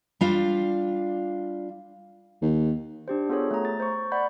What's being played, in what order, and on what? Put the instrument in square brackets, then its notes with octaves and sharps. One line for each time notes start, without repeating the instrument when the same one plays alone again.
[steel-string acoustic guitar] G3 D4 F4 F5
[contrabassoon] D#2
[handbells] D4 G4 C5
B3 F4 G#4 A4 C#5
A3 A#5
A6
C5 C#6
D5 F#5 B5 G6